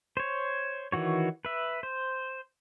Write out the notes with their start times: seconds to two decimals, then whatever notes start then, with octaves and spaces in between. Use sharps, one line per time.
0.17 C5 C#5
0.92 D#3 E3 F#4 C#5
1.45 B4 E5
1.83 C5